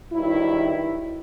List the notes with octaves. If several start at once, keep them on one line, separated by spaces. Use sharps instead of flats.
G2 D#3 F#3 E4